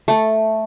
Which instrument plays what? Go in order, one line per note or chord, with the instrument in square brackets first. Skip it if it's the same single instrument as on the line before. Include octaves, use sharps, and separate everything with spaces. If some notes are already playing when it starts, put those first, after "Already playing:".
[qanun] A3